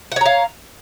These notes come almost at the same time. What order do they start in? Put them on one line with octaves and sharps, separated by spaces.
F#5 C#5 A#5 F5